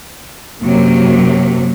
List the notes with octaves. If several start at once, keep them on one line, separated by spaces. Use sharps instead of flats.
F#2 C3 F#3 A#3